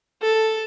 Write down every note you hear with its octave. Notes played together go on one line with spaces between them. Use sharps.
A4